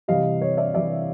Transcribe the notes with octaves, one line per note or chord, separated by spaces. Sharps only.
C3 E3 G3 D#5 F5
C#5 D#5
D5 E5
C3 E3 G3 D5 E5